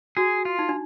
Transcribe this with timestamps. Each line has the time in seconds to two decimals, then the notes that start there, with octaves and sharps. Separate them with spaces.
0.17 F#4 G#4
0.45 F4
0.59 D#4
0.69 D4